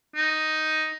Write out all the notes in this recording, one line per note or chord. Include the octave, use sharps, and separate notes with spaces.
D#4